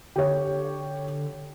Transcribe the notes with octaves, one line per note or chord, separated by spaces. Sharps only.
D3 G4 C#5